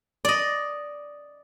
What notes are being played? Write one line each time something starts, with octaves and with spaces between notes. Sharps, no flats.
D5 D#5